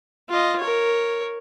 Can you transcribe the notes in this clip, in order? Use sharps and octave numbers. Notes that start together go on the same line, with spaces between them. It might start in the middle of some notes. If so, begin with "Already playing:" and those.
F4 D#5
A#4 C#5